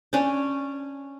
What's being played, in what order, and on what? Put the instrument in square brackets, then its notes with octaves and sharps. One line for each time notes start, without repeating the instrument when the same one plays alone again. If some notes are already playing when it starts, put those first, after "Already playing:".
[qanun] C#4 D4